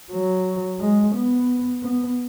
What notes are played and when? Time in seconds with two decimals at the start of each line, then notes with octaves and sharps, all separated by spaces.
0.12 F#3
0.79 G#3
1.15 B3
1.83 B3